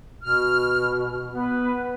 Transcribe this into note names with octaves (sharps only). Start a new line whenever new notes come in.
B2 F6
B3 B4